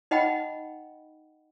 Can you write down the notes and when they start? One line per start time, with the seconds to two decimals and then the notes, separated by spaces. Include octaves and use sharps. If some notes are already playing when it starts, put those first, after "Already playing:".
0.11 D#4 D#5 F#5 G5 B5